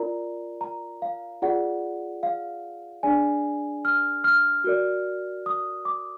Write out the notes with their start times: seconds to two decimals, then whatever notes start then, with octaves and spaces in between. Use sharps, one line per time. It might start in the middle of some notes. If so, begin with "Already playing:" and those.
Already playing: F4 A#4 D5 A#5
0.61 A#5
1.02 F5
1.42 F4 G#4 D5 F#5
2.23 F5
3.03 D4 G#4 D5 G#5
3.85 F6
4.24 F6
4.64 F#4 A#4 D5
5.46 D#6
5.85 D6